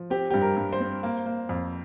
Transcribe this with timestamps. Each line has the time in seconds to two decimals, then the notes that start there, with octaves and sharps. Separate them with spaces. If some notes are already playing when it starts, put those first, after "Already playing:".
Already playing: F3
0.10 C4 G4
0.31 G2 G4
0.42 A#4
0.57 G2
0.73 C5
0.80 C4
1.03 A#3
1.26 A#3
1.49 F2